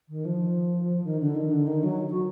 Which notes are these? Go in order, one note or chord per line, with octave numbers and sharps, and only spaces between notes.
D#3
F3
D#3
D3
D#3
D3
D#3
F#3
F#4